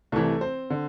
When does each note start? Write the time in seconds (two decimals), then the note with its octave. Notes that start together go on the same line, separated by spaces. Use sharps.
0.12 C2 C3 E3 A3 A4
0.41 C4 C5
0.70 D3